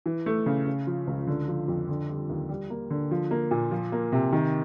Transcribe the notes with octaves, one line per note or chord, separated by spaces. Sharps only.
E3
A3
C#3
C#3
F3
C#2
D3
F3
F2
D3
G3
D#2
G3
A#3
D3
F3
A#3
A#2
F3
A#3
C3
D#3